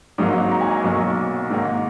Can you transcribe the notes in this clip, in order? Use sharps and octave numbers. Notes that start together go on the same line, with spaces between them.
G#1 G#2 F#3 A#3 D#5
A#5
G#5
A#5
B1 B2 F#3 A#3 C#6
G#2 D#3 A#3